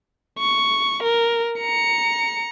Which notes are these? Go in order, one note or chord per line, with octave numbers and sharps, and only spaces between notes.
C#6
A#4
A#5 C#7